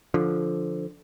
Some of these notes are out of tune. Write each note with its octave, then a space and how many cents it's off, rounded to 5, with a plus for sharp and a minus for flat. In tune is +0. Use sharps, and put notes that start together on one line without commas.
D3 +0 F3 +0